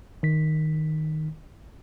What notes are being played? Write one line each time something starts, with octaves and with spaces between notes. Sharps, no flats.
D#3 B6